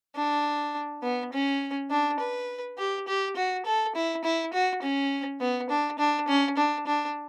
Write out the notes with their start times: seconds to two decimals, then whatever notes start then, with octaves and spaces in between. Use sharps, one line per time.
0.16 D4
1.03 B3
1.33 C#4
1.90 D4
2.20 B4
2.78 G4
3.08 G4
3.36 F#4
3.66 A4
3.95 E4
4.24 E4
4.53 F#4
4.82 C#4
5.40 B3
5.70 D4
5.99 D4
6.28 C#4
6.57 D4
6.87 D4